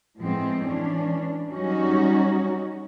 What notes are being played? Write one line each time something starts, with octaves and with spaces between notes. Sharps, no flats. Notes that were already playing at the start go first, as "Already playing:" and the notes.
A2 F3 G#3 B3 C4
E3 C#4 D4
F#3 G3 C#4 D#4 F#4